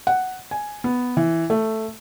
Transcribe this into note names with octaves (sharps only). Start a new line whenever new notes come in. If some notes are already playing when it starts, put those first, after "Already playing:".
F#5
G#5
B3
E3
A3